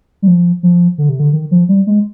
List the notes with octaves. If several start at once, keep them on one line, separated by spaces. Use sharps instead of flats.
G3
F3
F3
D3
C3
D3
D#3
F3
G3
G#3